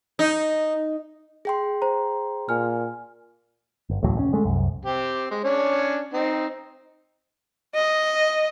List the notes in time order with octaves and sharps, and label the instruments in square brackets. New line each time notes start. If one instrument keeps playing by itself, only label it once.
[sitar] D#4
[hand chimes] G#4 G5 C6
[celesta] C5 A#5
[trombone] A#2 [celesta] G#5 F6
[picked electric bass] G1
A1 D2 A2 F#3
F1 A2 C#4
D3 G#3 A3
C2 F#2
[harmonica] C4 G4
G#3
C#4 D4 C#5
C4 D#4
[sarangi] D#5